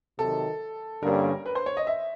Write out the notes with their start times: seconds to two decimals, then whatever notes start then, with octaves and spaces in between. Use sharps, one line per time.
0.18 C3 D#3 F#3 A4
1.03 G2 D3 G3 A#3 C#4 A#4
1.46 B4
1.55 C5
1.66 C#5
1.77 D#5
1.87 E5